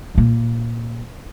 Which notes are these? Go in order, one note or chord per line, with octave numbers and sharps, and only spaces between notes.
A#2 A#3